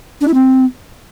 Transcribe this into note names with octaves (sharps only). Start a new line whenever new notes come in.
D4
E4
C4